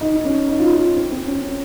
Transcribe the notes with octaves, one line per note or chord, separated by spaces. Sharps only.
D#4
D#4
C#4
D#4
F4
F4
D#4
C4
C4
C#4
C#4